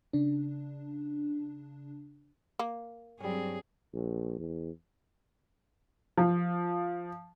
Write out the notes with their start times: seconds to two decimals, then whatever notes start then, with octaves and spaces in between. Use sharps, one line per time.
0.13 C#3 D4
2.59 A#3
3.20 G2 F#3 G3 C4 C#4 G#4
3.94 A#1
4.39 E2
6.17 F3